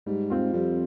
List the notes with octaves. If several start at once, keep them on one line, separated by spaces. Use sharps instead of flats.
G#2 G3
C4 F4
F2 G3